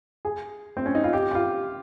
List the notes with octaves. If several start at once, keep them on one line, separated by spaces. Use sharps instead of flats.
G#4
C4
C#4
D#4
F4
G4
G4
F4